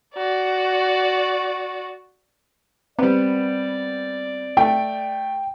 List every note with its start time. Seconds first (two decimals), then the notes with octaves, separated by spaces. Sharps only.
0.15 F#4 D5
2.99 G3 B3 C4 D5
4.57 A3 G5